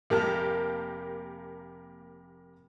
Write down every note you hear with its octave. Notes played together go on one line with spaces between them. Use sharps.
F1 A#3 G4 A#4 A5 F6